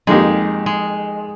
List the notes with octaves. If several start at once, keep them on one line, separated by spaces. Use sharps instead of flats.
F2 D#3 G#3 A#3 D#4 G4
G#3